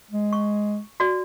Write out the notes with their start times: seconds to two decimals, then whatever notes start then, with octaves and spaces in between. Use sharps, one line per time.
0.11 G#3
0.33 C#6
1.00 F#4 D5